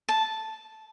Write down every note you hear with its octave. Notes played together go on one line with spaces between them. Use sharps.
A5